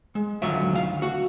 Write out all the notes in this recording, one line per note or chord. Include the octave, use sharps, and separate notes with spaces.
G#3
D2 D#3 F#3 F4 E5
D2 F5
F#4